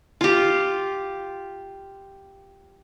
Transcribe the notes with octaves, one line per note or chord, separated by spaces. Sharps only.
F4 G4